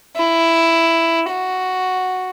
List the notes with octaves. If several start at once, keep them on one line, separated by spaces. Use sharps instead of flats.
E4
F#4